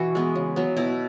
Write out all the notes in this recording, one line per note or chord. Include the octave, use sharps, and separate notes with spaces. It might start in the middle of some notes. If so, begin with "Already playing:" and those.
Already playing: B2 E3 E4 F#4
G#3 B3
C#3
F#3 B3
B2 E4